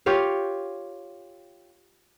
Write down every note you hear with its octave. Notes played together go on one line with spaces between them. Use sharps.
F4 G4 C#5 F5